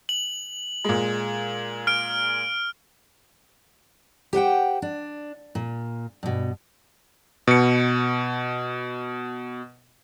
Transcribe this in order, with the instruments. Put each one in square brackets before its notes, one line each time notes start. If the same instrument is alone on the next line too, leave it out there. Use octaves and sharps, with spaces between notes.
[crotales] F#7
[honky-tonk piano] A#2 G#3
[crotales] F6 D7
[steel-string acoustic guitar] G4 C5 F#5 G5
D4
A#2
G2 B2
[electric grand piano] B2 C#7